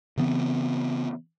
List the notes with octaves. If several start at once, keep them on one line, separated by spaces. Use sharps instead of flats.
C#3 E3 B3 C4